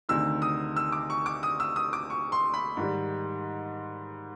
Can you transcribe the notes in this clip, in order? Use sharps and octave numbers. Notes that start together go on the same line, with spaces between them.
D2 C3 D#3 E6
D#6
E6
D6
C#6
D6
D#6
E6
D#6
D6
C#6
C6
B5
G#2 D#3 G3